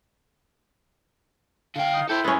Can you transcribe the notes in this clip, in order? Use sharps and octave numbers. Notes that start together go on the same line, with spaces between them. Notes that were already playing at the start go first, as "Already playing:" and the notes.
D3 F5 G5
D#4
E4 A4 C5 G5
F#2 G#3 B3 C#4